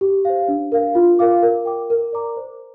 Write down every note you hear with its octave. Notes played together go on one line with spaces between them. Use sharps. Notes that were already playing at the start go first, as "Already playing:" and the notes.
G4
C5 F5
D4
A#4 F5
F4
A#4 F5 D6
A#4
G5 D6
A#4
D5 A#5 D6
C5